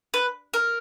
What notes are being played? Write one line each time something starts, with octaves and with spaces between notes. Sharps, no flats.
B4
A#4